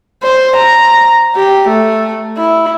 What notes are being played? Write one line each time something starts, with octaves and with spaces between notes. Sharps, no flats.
C5
A#5
G4
A3
E4